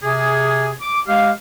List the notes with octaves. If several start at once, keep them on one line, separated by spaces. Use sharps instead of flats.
C3 G#4
D6
G#3 G4 F5